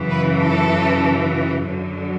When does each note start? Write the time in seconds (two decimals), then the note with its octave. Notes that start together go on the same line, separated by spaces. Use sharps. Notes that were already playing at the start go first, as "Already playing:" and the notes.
Already playing: F#2 C#3 E3
0.11 B4
0.42 A4
1.65 F#2 D3 F#3